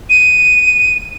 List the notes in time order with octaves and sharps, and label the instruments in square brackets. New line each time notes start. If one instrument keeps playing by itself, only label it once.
[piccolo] D#7